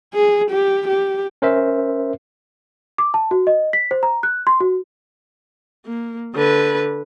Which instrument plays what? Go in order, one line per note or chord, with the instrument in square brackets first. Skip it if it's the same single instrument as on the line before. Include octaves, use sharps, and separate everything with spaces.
[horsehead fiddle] G#4
G4
G4
[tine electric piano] C#4 A#4 C5 E5
[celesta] D6
A5
F#4
D#5
B6
C5
A#5
F#6
C6
F#4
[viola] A#3
D3 B4